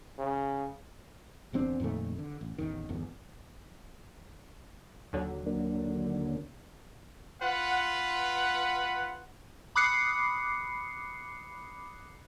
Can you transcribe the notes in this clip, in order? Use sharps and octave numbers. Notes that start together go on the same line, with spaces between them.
C#3
D1 E2 C4 D4
F2 A#2 D#3 A3
D3
A1
A1 E2 D#3
G1 E2
D#2 D3 F#3
A#3 D4
F4 B4 F#5
B5 D6 D#6 F#6 C7 C#7